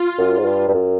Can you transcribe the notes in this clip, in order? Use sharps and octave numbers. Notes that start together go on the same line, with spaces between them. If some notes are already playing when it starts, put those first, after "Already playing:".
Already playing: F4
F#2
G#2
G2
G2
F#2